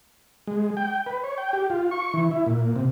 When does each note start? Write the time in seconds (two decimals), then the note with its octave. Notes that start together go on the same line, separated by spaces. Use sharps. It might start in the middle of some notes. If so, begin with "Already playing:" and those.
0.47 G#3
0.77 G5
1.06 B4
1.24 C#5
1.38 G5
1.53 G4
1.70 F4
1.91 C#6
2.14 E3
2.31 E4
2.46 A#2
2.76 C3